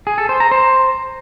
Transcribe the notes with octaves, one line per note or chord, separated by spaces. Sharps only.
G#4
A4
C5
A#5
C5